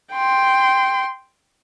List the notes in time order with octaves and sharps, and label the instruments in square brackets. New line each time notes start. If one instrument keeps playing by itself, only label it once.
[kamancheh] G5 C6